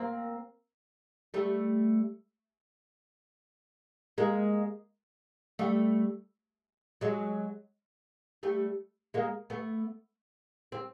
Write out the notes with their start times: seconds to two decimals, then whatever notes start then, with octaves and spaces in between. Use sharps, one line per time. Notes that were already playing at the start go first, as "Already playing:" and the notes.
Already playing: A#3 C4
1.34 G3 A3
4.18 G#3 A#3
5.59 G3 A3
7.01 F#3 G#3
8.43 G3 A3
9.14 G#3 A#3
9.50 A3 B3
10.72 C4